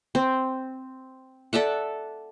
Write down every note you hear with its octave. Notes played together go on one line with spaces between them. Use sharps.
C4
A4 D5 E5 F#5